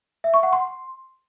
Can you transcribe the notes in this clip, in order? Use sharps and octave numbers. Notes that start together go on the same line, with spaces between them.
E5
C#6
F#5
C6